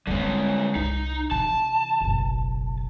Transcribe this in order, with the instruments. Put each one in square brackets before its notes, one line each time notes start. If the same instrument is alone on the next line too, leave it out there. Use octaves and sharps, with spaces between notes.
[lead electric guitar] D3 G#3 [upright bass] G3 B3
[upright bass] C2 [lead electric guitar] D#4
[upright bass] C3 E3 [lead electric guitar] A5
[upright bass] F#1 B1